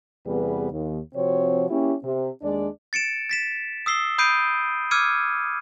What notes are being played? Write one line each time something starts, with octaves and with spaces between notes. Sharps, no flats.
E2 C3 G3 B3 G#4 B4
D#2
C3 F3 C4 F#4 C#5
A#3 C#4 E4 G4
C3
D#2 G#3 D4 D5
A6 C#7 D7 E7
A6 B6 E7
D#6 E6 C7 G7
B5 D#6 G6 C7 D7 D#7
D6 E6 F6 G#6 C#7 D#7